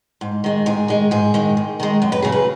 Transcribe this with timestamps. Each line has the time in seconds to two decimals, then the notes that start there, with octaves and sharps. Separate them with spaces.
0.21 G#2
0.44 D#3 G#3
0.66 G#2 G#4
0.88 D#3 G#3
1.11 G#2 G#4
1.34 D#3 G#3
1.57 G#2
1.80 D#3 G#3
2.02 F#2
2.12 B4
2.22 C#3 F#3 G#4
2.32 B4